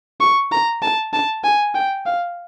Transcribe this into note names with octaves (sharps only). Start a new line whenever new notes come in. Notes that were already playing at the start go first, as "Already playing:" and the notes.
C#6
A#5
A5
A5
G#5
G5
F5